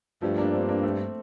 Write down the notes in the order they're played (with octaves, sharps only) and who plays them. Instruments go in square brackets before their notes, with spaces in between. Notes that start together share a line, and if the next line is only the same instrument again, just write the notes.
[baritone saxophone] G2 [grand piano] F3 A3
[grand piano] A#3 D4
A3 C4
A#3 D4
A3 C4